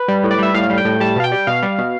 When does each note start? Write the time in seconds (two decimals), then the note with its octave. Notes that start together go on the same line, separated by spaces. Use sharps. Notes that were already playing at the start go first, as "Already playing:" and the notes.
Already playing: B4
0.08 G3
0.24 A2
0.31 D5
0.39 G3 E5
0.54 A2 F5
0.70 G3
0.78 G5
0.85 A2
1.00 G3 A5
1.16 B2 F5
1.24 G5
1.32 G3
1.47 B2 F5
1.63 G3
1.78 B2